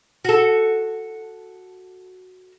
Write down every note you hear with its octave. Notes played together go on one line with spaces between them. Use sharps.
F#4 A4